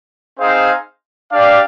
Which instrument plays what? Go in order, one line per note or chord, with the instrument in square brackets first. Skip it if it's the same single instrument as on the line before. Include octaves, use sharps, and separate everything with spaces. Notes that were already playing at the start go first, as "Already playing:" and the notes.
[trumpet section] C4 D#4 G#4 C5 F5
D4 G4 D5 F5